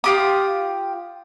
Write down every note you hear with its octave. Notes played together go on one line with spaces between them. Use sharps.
F4 G4 D#6